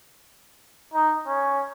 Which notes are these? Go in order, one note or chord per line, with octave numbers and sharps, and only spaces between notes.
D#4
C#4